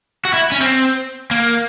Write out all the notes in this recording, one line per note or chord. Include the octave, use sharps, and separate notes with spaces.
F#4
E4
C#4
C4
A#3